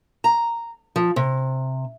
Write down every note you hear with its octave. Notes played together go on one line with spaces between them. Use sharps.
A#5
F3
C3